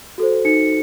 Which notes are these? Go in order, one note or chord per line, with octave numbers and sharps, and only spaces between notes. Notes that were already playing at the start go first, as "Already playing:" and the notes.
F#4 A4 C5
D#4 C#7